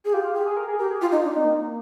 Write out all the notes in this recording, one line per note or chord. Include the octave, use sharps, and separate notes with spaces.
G#4
F4 G4
F4
G4 G#4
G#4
A#4
G#4
G4 A#4
G#4
F4 G4
D#4
D4
C4 D#4
A#3